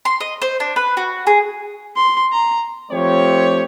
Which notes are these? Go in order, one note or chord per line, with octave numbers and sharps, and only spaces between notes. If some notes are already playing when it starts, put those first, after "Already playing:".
C6
D#5
C5
D4
B4
F#4
G#4
C6
A#5
F3 A3 C4 G4 C#5